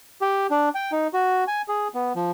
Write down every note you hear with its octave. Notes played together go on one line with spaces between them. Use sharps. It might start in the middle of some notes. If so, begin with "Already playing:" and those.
G4
D4
G5
D#4
F#4
G#5
G#4
B3
F3